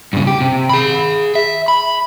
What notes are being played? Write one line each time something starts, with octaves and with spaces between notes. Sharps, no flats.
G2 C#3
G4
C3
G#4 B5
E5
B5